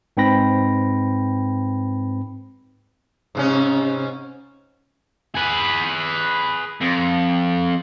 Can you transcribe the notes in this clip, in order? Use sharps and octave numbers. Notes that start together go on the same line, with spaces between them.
G#2 C4 B4 G5 B5 A#6
G#2 C3 C#4
G#4 B4
F2